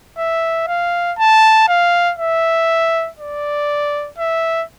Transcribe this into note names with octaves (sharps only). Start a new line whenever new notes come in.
E5
F5
A5
F5
E5
D5
E5